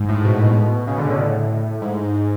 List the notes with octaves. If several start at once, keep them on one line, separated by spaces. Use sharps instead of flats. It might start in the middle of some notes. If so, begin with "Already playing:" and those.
Already playing: G#2
A2
B2
C#3
D3
A2
G#2